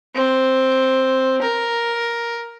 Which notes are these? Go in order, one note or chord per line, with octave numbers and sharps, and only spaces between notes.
C4
A#4